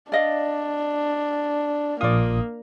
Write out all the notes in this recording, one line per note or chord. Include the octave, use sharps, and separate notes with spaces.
D4 D5 D#5 F5
A#1 A#3 F4 D5 D#6